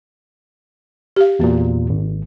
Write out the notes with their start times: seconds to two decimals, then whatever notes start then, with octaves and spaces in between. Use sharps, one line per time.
1.16 G4 F5
1.39 E2 A#2 A#3 F#4
1.89 G#1